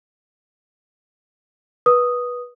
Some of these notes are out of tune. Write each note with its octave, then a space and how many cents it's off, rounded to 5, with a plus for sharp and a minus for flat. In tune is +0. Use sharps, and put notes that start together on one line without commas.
B4 -20 D#6 +0